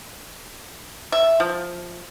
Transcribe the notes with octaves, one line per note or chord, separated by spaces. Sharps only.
E5
F3